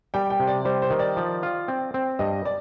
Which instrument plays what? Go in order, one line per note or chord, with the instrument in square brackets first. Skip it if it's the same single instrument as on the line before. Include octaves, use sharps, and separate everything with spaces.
[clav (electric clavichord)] G3 [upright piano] G5
[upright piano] G5
[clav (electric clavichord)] C3
[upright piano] D5
[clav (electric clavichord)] G3 [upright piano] C5
[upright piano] C5
[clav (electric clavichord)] D#3
[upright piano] D5
[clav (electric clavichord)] F3
F4
C4
C4
[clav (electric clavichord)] G2 [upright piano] D#5
[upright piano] D5